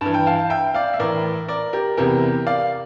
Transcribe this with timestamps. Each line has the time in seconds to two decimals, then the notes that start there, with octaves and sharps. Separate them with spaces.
0.01 G2 E3 A5
0.14 G5
0.27 F5 A5
0.50 E5 G5
0.74 D5 F5
0.93 E5
0.99 A2 E3 A#4 D5
1.48 A#4 D5
1.73 G4 A#4
1.98 E2 C3 E3 G4 A#4
2.47 D5 F5